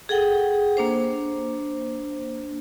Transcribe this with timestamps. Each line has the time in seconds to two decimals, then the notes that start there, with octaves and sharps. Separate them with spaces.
0.09 G#4 A4 F#5 G5
0.77 A#3 D4 C5